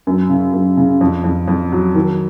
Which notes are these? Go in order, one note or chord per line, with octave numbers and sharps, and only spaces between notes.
F#2
C#3
F#2
C#3
F2
F2
F2
F#3
D#3